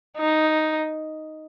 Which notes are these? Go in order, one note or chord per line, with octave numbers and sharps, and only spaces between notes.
D#4